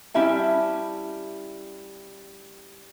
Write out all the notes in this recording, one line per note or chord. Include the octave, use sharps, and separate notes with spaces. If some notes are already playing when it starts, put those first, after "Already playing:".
G3 C#4 E4 E5 A5